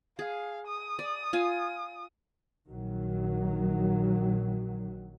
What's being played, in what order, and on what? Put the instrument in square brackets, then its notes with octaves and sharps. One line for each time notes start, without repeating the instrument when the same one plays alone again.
[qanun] G#4 [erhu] F5
[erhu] D#6
[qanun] D5
F4 G#5
[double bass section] A#1 D#3 F#3